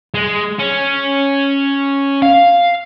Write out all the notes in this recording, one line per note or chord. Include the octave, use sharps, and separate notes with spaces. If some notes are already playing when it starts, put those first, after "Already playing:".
G#3
C#4
F5